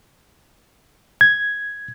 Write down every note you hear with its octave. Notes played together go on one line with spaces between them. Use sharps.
G#6